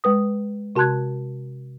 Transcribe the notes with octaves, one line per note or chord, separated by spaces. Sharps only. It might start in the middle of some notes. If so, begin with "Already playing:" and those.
G#3 B4 D#6
C3 F#4 A5 C6 F#6 G#6